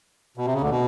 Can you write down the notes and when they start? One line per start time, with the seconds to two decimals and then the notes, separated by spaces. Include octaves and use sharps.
0.38 B2
0.45 C3
0.54 C#3
0.61 D2 D3
0.70 B2